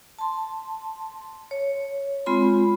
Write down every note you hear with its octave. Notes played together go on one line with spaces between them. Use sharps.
A5 C6
C#5
G#3 C4 F4 B5 C6